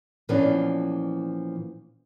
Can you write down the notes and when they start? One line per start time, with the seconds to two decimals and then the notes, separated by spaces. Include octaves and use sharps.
0.29 A#2 E3 F3 B3 C#4 D4